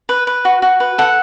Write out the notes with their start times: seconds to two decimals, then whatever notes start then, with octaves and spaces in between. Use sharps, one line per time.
0.09 B4
0.27 B4
0.45 F#4
0.62 F#4
0.80 B4
0.98 A4 F#5